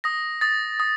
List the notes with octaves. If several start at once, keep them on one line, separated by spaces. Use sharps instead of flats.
D#6 A#6
D#6 A6
D#6